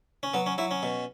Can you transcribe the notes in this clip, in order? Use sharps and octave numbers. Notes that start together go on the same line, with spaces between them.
C#4
F#3 B3
C#4
F#3 E4
C#4
B2